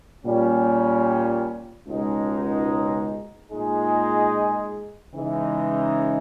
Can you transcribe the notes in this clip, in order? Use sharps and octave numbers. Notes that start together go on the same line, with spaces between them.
A#2 G3 C#4
C#2 B2 G#3 D#4
A#2 G#3 D#4 G#4
C#3 E3 G#3 D#4